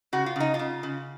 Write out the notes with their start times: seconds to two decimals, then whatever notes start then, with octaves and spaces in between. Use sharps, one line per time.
0.13 C#3 F#4
0.26 F4
0.36 C#3 D#4
0.54 F4
0.59 C#3
0.83 C#3